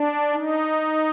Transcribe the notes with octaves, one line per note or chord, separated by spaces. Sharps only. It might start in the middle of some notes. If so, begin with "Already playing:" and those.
Already playing: D4
D#4